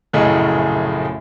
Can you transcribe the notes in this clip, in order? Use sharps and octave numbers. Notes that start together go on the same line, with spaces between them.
A#1 F#2 A2 C#3 D#5